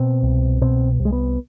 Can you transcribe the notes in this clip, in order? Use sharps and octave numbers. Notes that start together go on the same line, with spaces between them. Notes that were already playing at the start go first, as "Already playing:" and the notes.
Already playing: B2 C4
C2
B2 C4
C2
G#3
B3